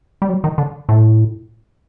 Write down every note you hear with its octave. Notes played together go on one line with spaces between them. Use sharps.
G3
F#3
D#3
D3
A2